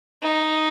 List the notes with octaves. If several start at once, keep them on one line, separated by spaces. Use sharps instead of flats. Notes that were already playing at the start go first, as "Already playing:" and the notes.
D#4